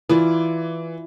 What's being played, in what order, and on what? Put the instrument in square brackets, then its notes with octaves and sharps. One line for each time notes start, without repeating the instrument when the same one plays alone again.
[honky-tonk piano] E3 [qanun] E4 F4 D5